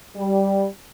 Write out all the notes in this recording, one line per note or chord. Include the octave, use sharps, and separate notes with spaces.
G3